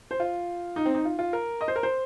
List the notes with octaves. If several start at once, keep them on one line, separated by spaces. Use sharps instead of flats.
C5
F4
D#4
C4
D#4
F4
F4
A#4
D#5
C5
A#4
C5